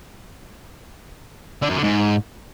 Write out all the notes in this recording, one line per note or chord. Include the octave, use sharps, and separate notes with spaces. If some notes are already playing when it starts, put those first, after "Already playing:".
D3
F#2
D3
G#2